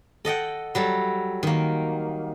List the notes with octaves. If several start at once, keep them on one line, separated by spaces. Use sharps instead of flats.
A4 D#5 F#5 G5
F#3 G3 A4
D#3 A#3